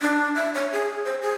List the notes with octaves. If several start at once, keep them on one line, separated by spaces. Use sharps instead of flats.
D4
E5
C#5
G#4
C5
G#4